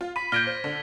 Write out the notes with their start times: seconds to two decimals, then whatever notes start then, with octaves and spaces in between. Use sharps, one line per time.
0.01 F4
0.16 B5 B6 D#7
0.32 A#2 F6 G6 G#6 A#6 D7 G7
0.47 C5
0.64 D3